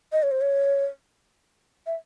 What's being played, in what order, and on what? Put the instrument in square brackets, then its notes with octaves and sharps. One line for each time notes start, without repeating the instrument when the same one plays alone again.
[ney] D#5
C#5
C5
C#5
E5